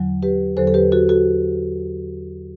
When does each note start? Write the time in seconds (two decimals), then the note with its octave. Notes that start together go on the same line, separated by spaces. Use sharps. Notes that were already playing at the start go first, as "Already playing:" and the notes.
Already playing: E2 D3 F#3
0.23 G4 B4
0.57 E2 D3 F#3 A4 C5
0.67 A4
0.74 G4 B4
0.92 F#4 A4
1.09 F#4 A4